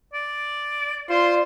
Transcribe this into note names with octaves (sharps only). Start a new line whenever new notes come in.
D5
F4 C5 D5 C6